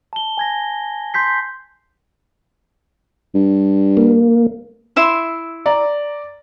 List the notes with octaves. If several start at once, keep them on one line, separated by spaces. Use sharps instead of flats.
A5 G7
G#5 G#6 A#6
C6 G6 B6 C7
G2
A#3
E4 E5 C6
D5 A#5